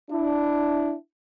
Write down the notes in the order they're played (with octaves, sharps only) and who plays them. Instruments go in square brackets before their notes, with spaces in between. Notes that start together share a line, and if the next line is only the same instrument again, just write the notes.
[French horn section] D4 E4